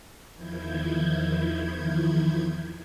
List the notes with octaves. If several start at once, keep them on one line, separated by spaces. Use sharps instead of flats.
E2 D#3 F3 E4 G6 G#6